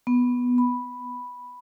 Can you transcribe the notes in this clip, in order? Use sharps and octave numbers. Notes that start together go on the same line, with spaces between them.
B3
B5